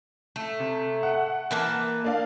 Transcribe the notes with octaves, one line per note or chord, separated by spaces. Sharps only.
A3
C3
F#5
E3 A#3 A5
A#3 D4 F5